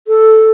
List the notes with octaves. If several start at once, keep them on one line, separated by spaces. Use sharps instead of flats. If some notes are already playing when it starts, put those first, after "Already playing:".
A4